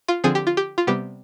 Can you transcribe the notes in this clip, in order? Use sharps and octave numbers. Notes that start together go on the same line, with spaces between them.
F4
D3 F3 C4 G#4
G4
F4
G4
F4
C3 G3 B3 G4